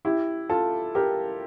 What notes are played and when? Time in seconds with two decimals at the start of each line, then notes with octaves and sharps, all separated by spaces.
0.05 E4 G4
0.49 F4 A4
0.95 G4 A#4